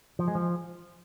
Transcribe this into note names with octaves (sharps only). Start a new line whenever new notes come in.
F3
G#3
F3